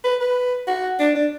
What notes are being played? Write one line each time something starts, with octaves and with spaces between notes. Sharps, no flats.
B4
B4
F#4
D4
D4